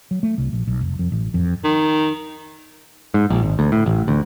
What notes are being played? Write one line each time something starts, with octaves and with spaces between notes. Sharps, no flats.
F#3
A3
C2
A#1
B1
F1
F2
A1
F2
D#3
G#2
A#1
G#1
D2
A2
A1
D2